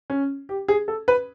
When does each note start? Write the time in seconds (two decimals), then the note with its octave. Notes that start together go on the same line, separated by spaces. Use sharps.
0.10 C#4
0.49 G4
0.68 G#4
0.88 A4
1.08 B4